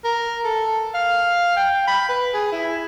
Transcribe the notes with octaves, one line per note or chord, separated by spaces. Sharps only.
A#4
A4
F5
G5
B5
B4
G#4
E4